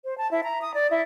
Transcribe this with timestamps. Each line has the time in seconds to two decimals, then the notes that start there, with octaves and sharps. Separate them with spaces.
0.04 C5
0.18 A5
0.31 E4
0.44 A#5
0.62 D#6
0.74 D5
0.91 E4